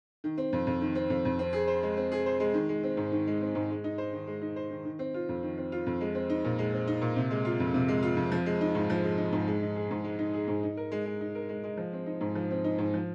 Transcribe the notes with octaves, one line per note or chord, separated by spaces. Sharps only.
D#3
C4
F2
F2
D#3
C4
F2
F2
C4
G#4
C5
G#3
C4
G#4
C5
G#3
D#3
G#3
C4
G#2
D#3
G#3
C4
G#2
G#3
D#4
C5
D#3
G#3
D#4
C5
D#3
D#3
C4
F4
F2
D#3
C4
F4
F2
G#3
C4
D#4
A#2
G#3
C4
D#4
A#2
C3
G#3
F4
F2
C3
G#3
F4
F2
F3
G#3
D#4
G#2
F3
G#3
D#4
G#2
G#3
D#4
G#4
G#2
G#3
D#4
G#4
G#2
D#4
A#4
G#3
G#3
D#4
A#4
G#3
G#3
F3
C4
D#4
G#2
F3
C4
D#4
G#2
F3